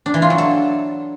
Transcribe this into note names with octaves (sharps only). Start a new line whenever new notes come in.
D4
E3
F4
F#3
A4